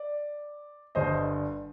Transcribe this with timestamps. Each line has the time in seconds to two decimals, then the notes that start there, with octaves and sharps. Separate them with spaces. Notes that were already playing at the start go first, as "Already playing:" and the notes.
Already playing: D5
0.95 G1 G2 D3 C5 D#5